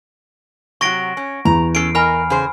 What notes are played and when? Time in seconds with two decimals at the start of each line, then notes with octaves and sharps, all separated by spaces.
0.81 C3 F#3 F#4 C#6 A#6 D7
1.17 C#4
1.45 E2 A#5
1.75 C#4 A4 C7 D7
1.95 A#4 D#5 G#5 B5 F6
2.30 C#3 G#4 C5